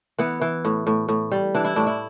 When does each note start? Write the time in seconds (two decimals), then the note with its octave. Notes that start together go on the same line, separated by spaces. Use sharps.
0.18 E3 B3
0.41 E3
0.65 A2
0.87 A2
1.08 A2
1.31 G3
1.55 E3 D4
1.65 E4
1.76 A2 D4
1.87 E4